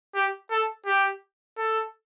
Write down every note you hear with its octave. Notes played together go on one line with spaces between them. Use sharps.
G4
A4
G4
A4